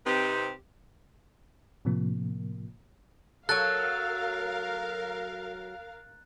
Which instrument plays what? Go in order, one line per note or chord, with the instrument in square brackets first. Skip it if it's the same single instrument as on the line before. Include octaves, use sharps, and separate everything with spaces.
[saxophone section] C3 C4 D#4 G4 B4 C5
[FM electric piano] A2 C3 F3 A#3
[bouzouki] F#3 A4 [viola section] A#4 F5 [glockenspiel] F#6 A6